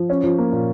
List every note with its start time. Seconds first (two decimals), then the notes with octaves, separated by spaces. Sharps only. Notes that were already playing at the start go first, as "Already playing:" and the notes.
Already playing: F3
0.10 C#4
0.23 F3
0.38 A#3
0.52 A#2